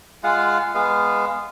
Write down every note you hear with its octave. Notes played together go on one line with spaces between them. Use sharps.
G#3 F4 F5 F#5
G#3 B3 F5